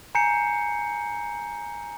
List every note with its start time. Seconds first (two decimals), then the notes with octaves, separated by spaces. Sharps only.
0.15 G#5 A#5 G6 C7 C#7